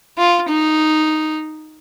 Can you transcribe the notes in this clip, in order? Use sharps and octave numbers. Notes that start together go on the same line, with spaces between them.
F4
D#4